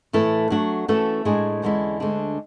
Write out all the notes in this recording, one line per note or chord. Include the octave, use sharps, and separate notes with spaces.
A2 E3 A3 E4 A4
F#3 A3 D4 F#4
E3 A3 C#4 F#4 A4
A2 G#3 D4 G#4
E2 D3 G#3 C#4 E4
D2 D3 G#3 D4